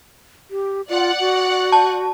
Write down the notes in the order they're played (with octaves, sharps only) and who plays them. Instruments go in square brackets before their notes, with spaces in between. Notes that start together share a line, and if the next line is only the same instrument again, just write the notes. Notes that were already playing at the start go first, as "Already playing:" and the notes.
[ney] G4
[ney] F4 [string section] D5 F#5
[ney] F#4
[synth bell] A5